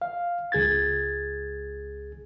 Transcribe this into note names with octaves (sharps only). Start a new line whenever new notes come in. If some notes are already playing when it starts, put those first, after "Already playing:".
F5
C#2 G#4 G#6 A6